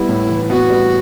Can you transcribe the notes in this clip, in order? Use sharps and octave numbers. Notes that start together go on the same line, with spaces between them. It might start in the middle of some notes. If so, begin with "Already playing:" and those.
Already playing: G3 B3 E4
A2
E3
B3 F#4
G3